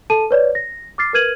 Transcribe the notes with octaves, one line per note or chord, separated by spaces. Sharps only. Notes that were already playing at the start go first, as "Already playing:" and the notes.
A4 A5 D#7
B4 C#5 D5
A#6
D6 F6 A6 C7
A#4 B4 F6 G#6 D#7 F#7